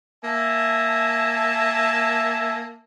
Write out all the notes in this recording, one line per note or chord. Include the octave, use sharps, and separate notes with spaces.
A#3 E5 G#5 A5